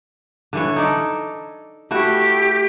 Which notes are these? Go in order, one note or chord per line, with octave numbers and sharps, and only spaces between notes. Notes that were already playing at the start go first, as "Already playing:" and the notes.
D3 E3 C#5
D#4 A4 D5
A3 E4 F#4 G4